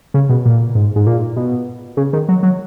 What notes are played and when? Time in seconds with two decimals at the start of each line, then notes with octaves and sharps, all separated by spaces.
0.14 C#3
0.29 B2
0.46 A#2
0.75 G#2
0.96 G#2
1.07 A#2
1.36 B2
1.97 C#3
2.13 D#3
2.29 F#3
2.43 F#3